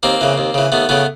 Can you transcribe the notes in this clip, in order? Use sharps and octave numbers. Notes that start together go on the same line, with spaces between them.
D#2 A#3 C4
C#3 E3
D#2
C#3 E3
D#2 A3 B3
C#3 E3 A3 B3